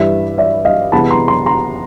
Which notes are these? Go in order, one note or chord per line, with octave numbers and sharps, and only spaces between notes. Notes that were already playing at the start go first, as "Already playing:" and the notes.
Already playing: G2 E3 G3 D5 E5
D5 E5
D#5 F5
C3 E3 G#3 B3 A5 B5
A#5 C6
A#5 C6
A#5 C6